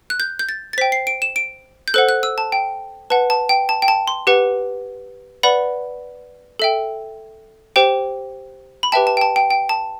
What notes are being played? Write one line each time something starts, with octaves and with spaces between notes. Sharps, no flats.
F#6
G6
G6
A6
A6
C5 G5 B6
C7
D7
E7
D7
G6
A4 C5 F#5 F#6
F#6
E6
A5
G5
B4 F#5 A5
A5
G5
A5
G5
A5
C6
G4 B4 F#5
B4 D5 F#5 B5
A4 E5 G5
G4 C5 G5
B5
G4 B4 E5 G5 A5
A5
G5
A5
G5
G5
A5